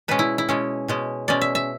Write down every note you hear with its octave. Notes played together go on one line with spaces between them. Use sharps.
B2 G#3 C#4 B4
E4
E4
B2 G#3 C#4
B2 G#3 C#4
B2 G#3 C#4 D5
E5
E5